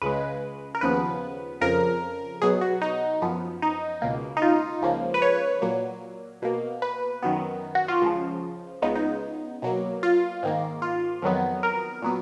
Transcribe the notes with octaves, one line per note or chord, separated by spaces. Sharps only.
C#2 C#3 G#3 B4
A#4
D#2 C#3 F3 B3 B4
F2 C#3 F3 A#4
B2 F#3 B3 G#4
F#4
D#4
F#2 F3 B3
D#4
C#2 B2 A#3
D#4
F4
C#2 C#3 F3 A#3
B4
C#5
A#2 F#3 A#3
B2 A#3
B4
F#2 D#3 F#3 B3
F#4
F4
C#2 C#3 F3
C#2 C#3 G#3 B3 D#4
D#4
B2 F#3 A#3
F4
G#2 D#3 A#3
F4
F2 D#3 F#3 B3
A#4
A#2 F#3 B3